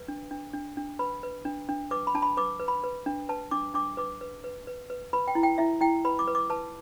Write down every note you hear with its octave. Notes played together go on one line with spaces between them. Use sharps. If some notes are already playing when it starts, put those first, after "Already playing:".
Already playing: B4
D4
D4
D4
D4
B4 B5
B4
D4
D4
B4 D6
B5
D4 A5
B5
B4 D6
B4
B5
B4
D4
B4 A5
D4 D6
D4 D6
B4 D6
B4
B4
B4
B4
B4 B5
G5
E4
G5
E4 E5
E4 G5
B4 B5
D6
B4
D6
B4 A5